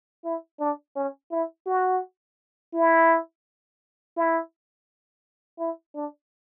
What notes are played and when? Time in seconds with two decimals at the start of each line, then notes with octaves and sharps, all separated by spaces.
0.24 E4
0.60 D4
0.96 C#4
1.31 E4
1.67 F#4
2.74 E4
4.17 E4
5.59 E4
5.95 D4